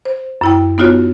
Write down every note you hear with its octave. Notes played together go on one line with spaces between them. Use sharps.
C5
F#2 E4 G5
B3 D#4 F4 F#4 C#5